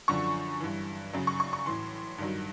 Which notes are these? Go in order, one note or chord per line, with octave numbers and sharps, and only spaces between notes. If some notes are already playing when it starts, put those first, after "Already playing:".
F#2 D3 F3 C#6
G2 E3
F#2 C#3 F#3
C#6
C#6
C#6
A2 E3 C6
G2 D#3 F#3